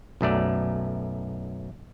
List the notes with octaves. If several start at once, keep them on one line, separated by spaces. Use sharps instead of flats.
B1 F#2 A3 D5